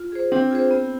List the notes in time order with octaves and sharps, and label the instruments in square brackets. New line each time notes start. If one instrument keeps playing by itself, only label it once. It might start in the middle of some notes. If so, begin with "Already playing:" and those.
Already playing: [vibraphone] F4
G#4 C5
[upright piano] C4 [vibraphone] D4
[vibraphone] F4 G#4 C5
B3